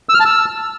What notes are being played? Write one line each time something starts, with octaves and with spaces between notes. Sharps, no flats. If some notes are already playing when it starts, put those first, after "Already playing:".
E6
F6
A5
E6